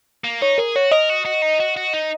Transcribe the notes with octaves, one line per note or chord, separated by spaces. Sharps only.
A#3
D#4 C#5
G#4 A#4
F#4 C#5
A#4 D#5
F#4
F#4
D#4
F#4
F#4
D#4